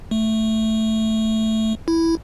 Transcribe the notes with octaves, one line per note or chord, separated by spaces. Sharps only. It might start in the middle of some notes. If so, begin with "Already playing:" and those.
A3
E4